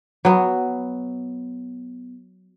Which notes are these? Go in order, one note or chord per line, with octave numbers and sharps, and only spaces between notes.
F#3 B3